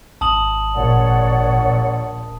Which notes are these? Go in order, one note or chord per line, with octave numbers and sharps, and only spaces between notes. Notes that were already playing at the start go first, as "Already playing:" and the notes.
G#1 A5 D#6 F#7
A#1 C#5 D5 F#5
D#1